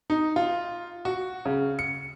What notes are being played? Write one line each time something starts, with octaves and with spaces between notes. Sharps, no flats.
D#4
F4
F#4
C#3
C#7